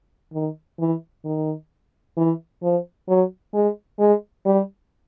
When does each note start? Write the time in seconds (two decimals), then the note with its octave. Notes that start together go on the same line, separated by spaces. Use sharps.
0.33 D#3
0.79 E3
1.25 D#3
2.17 E3
2.62 F3
3.08 F#3
3.54 G#3
3.99 G#3
4.46 G3